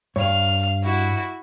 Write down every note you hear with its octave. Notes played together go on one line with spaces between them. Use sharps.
G2 C#5 F5 F6
E4 F#4